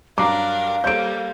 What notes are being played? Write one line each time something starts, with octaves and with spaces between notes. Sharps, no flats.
G2 F#3 D4 A#4 F5 A#5 D6 C7
G3 A#3 A4 C5 C#5 G6 D7